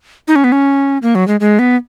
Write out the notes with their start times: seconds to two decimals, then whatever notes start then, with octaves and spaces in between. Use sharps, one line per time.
0.28 D#4
0.36 C#4
0.44 B3
0.52 C#4
1.03 A#3
1.15 F#3
1.28 G#3
1.40 G#3
1.59 B3